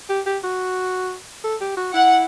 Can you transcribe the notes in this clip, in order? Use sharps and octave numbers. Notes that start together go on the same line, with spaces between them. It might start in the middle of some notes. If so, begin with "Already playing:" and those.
G4
G4
F#4
A4
G4
F#4
E4 F#5